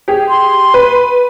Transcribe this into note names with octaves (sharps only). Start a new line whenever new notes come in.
G4 G#4
C6
B4